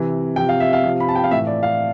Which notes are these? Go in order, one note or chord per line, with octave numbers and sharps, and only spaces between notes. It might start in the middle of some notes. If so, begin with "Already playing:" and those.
Already playing: C3 E3
C3 F3 G5
F5
E5
F5
C3 F3
B5
A5
G5
F5
A2 E3 E5
D5
F5